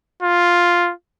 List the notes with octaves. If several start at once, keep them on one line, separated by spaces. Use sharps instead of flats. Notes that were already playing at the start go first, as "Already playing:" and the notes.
F4